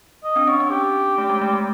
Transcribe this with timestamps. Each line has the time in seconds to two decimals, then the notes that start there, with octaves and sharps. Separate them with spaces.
0.24 D#5
0.36 C4 D4
0.47 C#4 C#5
0.60 C#4
0.71 G4
1.18 A3
1.30 G#3
1.41 A3
1.53 G#3